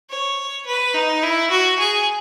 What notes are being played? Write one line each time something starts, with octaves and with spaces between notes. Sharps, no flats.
C#5
B4
D#4
E4
F#4
G#4